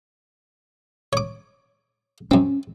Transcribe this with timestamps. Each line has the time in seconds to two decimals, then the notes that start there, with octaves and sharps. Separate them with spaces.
1.13 C#5 D6
2.31 F#2 C4 C#4